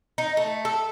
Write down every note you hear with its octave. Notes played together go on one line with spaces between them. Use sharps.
D#4
A3
A4